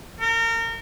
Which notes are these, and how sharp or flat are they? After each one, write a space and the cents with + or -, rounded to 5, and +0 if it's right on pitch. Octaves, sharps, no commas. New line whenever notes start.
A#4 -30